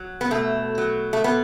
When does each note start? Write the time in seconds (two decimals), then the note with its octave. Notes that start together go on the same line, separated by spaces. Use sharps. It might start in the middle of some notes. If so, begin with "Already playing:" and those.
Already playing: F#3
0.21 B3
0.31 B2 A3
0.78 F#3
1.13 A3
1.24 B2 B3